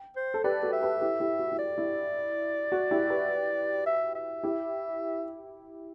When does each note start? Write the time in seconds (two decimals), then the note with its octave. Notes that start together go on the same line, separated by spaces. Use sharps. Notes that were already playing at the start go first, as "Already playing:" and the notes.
Already playing: G5
0.16 C5
0.34 A4
0.44 G4 B4 D5
0.63 F#4 A4
0.73 E5
0.82 G4 B4
1.01 E4 G4
1.20 E4 G4
1.39 F#4
1.52 E4
1.59 D5
1.78 E4
2.72 F#4
2.91 E4 G4
3.10 G4 B4
3.86 E5
4.15 E5
4.43 E4 G4